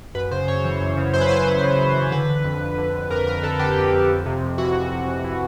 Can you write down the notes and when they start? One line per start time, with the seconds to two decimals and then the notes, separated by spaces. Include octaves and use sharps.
0.15 F#2 B4
0.31 C#3 C5
0.47 F#2 C#5
0.64 E3
0.81 F#2
0.97 C#3
1.13 F#2 C5
1.21 B4
1.29 E3 C5
1.46 F#2
1.63 C#3
1.79 F#2
1.96 E3
2.12 D3 B4
2.28 D3
2.44 F2
2.61 F2
2.78 D3
2.94 D3
3.10 F2 A#4
3.27 F2 A#4
3.43 D3 A4
3.59 D3 G4
3.77 F2
3.93 F2
4.10 F2
4.26 C3
4.42 F2
4.58 E3 F#4
4.75 F2
4.91 C3
5.08 F2
5.24 E3